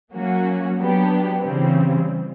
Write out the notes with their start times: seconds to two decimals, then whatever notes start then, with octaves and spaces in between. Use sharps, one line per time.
0.12 F#3 A#3 C#4 F#4
0.77 F#3 B3 D4 G4
1.42 C#3 E3 G3 C4